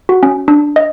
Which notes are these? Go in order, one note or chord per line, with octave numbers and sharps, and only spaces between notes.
F#4
C#4
D4
D#5